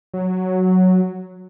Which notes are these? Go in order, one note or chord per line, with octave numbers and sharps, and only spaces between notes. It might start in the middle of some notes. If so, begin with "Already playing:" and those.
F#3